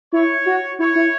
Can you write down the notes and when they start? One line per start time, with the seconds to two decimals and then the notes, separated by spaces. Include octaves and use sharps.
0.13 E4 C#5
0.46 F#4
0.79 E4 C#5
0.95 E4